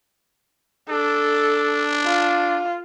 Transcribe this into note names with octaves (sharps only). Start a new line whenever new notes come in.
D4 A4
F4